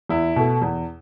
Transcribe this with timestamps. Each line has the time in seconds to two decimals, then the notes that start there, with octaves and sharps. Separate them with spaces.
0.09 E2 E4
0.36 B2 A3
0.62 E2